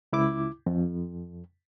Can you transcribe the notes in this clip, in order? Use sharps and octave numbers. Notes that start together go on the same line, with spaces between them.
C#2 E4 D6
F2